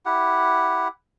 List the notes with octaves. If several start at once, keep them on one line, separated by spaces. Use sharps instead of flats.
E4 G4 F#5